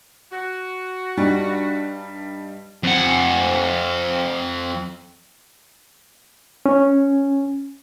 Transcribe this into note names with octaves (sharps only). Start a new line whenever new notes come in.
F#4
G2 G3 D#4
F2 F#5
C#4